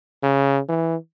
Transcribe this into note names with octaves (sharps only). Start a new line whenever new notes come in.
C#3
E3